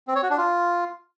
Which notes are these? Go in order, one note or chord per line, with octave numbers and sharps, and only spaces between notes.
C4
C#5
F#4
D4
F4